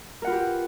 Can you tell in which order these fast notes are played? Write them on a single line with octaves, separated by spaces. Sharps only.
A#4 F#5 F4 B4 G4